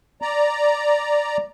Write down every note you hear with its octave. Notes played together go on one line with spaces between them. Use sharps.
D5 A#5